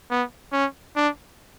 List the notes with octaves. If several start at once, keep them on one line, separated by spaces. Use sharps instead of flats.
B3
C#4
D4